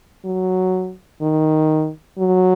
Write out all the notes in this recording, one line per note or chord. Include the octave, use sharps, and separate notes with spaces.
F#3
D#3
F#3